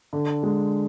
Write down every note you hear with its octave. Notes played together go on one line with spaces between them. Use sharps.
D3
G#3